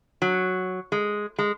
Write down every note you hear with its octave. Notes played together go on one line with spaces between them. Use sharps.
F#3
G#3
G#3